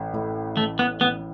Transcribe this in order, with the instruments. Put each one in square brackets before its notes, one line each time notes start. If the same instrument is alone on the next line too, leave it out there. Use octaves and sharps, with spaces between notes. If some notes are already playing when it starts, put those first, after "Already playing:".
Already playing: [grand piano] A1
A2
[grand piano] A1 [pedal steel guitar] A3
[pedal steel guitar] B3
[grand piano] A1 [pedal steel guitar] B3